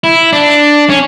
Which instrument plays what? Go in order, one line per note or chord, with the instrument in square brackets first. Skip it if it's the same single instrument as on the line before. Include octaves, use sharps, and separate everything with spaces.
[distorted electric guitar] E4
D4
C#4